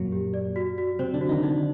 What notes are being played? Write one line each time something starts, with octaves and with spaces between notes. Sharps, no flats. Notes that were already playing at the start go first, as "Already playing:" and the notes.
Already playing: F#2 A#2 F#3 A#3
G4
D5
F#4
F#4
C3 C4 C5
D3 D4
F#4
D#3 D#4
D3 D4 D#4